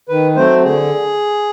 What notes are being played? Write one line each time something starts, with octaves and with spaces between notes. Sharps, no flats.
D#3 B4
F#3 A3 C4 C5
D3 G#4